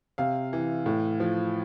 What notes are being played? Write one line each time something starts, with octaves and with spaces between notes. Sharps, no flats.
C3 F5
E3
A2
F3